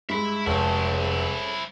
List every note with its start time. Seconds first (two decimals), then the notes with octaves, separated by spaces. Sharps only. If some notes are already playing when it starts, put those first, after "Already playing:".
0.09 G2 G#3 E5 B5
0.46 F1 E4 G#4 A4 C5 C#5